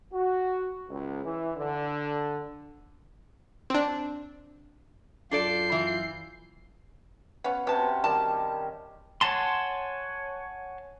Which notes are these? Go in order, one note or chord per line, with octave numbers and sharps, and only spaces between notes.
F#4
C#2
E3
D3
C4 D4
F#2 D4 F4 A4 D5 G6 C7
E3
B3 C#4 F5 F#5
C3 B3 C#4 A5
D#3 G3 A5
C#5 F#5 G#5 A5 C6